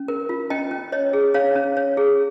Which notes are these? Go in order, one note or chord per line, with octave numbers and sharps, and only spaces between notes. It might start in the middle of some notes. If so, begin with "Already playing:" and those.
Already playing: C#4
A#4
F4
C#4 D#5 G5
C#4
C#5 D#5
G#4
C#4 C#5 F5
C#4
C#5
G#4